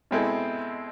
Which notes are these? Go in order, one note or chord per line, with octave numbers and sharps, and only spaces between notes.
B2 G#3 C4 E4 A4